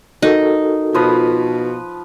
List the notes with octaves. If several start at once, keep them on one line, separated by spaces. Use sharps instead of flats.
D#4 F#4 A4 A#4
B2 F3 B4 D#6